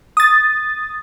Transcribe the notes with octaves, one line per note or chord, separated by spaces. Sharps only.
D#6 A6